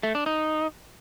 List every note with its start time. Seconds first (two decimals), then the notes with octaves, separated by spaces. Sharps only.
0.03 A3
0.15 D4
0.26 D#4